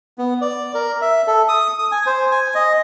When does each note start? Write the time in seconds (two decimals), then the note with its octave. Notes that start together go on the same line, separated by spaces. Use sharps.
0.18 B3
0.41 D5
0.75 A#4
1.01 E5
1.27 A4
1.48 D#6
1.79 D#6
1.92 G#5
2.06 C5
2.32 G#5
2.55 D#5